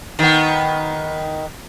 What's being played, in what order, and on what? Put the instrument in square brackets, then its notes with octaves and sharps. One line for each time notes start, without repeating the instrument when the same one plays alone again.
[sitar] D#3 B3